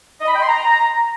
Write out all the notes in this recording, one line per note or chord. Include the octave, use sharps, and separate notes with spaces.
D#5
B5
G5
C6
A#5